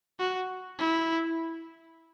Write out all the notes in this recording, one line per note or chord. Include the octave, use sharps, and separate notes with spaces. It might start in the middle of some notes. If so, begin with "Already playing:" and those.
F#4
E4